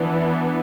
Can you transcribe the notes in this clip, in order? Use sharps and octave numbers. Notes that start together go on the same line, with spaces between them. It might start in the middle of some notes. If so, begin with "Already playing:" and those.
Already playing: E3 B3 D4